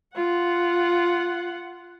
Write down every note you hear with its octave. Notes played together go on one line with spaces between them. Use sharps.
F4 F#5